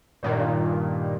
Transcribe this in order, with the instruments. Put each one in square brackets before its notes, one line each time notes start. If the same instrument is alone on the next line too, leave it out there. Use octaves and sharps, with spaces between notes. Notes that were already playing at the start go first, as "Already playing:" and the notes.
[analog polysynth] G2 A#2 D#3